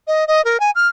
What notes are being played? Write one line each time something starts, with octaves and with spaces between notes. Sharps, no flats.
D#5
D#5
A#4
G#5
F6